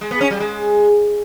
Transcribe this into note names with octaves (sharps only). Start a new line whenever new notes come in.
G#3
B3
C#4
G3
G#3